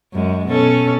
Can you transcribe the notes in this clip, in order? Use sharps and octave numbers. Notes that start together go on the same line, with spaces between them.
F#2 G#3
B2 C#4 A4